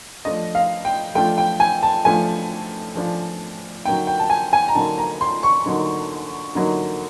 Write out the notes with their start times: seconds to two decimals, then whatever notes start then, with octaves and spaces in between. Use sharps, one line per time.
0.25 F3 A3 D4 F4 D#5
0.55 F5
0.85 G5
1.15 F3 A3 D4 F4 G5
1.38 G5
1.60 G#5
1.83 A5
2.05 F3 A3 D4 F4 G#5
2.95 F3 A3 D4 F4
3.85 D3 F#3 A#3 D#4 G5
4.07 G5
4.19 A5
4.30 G#5
4.53 G#5
4.68 A#5
4.75 D3 F#3 A#3 D#4 A5
4.98 A#5
5.21 C6
5.43 C#6
5.66 D3 F#3 A#3 D#4
6.55 D3 F#3 A#3 D#4